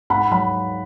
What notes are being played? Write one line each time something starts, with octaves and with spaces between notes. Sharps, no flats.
G#2 F#5 B5
F#3 B5